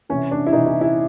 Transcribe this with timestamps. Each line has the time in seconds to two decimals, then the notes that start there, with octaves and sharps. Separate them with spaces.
0.09 C3 E3 C#4
0.31 D4
0.47 E4
0.53 C3 E3 D#4
0.66 E4
0.81 E4